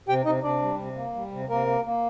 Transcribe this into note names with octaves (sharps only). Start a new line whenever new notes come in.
C3 G4 G5
C3 D#4 D#5
C3 D4 D5
G3
C3
A#3
G3
C3
C3 A#3 A#4
A#3
A#3